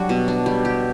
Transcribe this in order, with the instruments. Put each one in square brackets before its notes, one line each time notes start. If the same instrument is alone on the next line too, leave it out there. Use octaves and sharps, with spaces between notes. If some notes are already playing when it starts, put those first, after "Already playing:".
Already playing: [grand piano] F#3 [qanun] G3 D4 F#4
[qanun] B2
D4
G3
G4